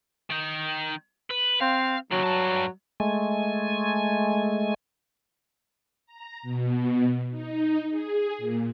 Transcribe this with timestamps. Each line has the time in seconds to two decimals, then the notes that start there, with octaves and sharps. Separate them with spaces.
0.30 D#3 D#4
1.31 B4
1.61 C4 F5
2.11 D#2 C#3 F#3
2.23 G2 A5
3.00 G#3 A3 G#5
6.06 A#5
6.43 B2
7.31 D#4
7.90 G#4
8.38 A#2